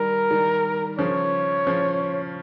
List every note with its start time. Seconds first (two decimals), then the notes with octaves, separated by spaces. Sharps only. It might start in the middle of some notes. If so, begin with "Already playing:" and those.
Already playing: D#3 G3 A#4
0.31 D#3 G3
0.99 C#3 F3 C#5
1.67 C#3 F3